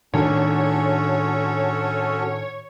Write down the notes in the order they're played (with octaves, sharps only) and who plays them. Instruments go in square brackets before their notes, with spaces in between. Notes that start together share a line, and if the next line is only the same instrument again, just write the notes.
[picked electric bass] A2 D#3 D4 [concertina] C#4 [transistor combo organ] F#4 A4 [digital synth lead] C#5